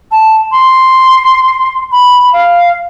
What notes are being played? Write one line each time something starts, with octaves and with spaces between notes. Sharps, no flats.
A5
C6
B5
F5